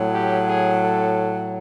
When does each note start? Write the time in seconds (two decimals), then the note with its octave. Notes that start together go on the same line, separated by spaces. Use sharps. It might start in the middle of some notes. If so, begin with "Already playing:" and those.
Already playing: A2 F#3
0.14 G4
0.48 G#4
0.84 A4